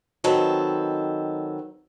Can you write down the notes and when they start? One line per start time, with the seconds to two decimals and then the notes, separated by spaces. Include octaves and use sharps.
0.24 D#3 F#3 C4 A4 B4